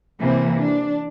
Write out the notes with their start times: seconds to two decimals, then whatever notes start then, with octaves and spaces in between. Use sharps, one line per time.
0.21 C3 E3 A#3 C4
0.57 D4